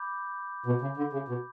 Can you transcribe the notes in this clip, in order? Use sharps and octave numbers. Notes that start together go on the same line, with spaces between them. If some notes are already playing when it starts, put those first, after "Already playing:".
Already playing: B5 D6 G6
B2
C#3
D3
C#3
B2